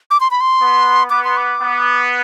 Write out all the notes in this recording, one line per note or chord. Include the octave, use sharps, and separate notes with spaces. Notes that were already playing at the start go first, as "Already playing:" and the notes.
D6
C6
B5
C6
B3
B3 D6
C6
D6
B3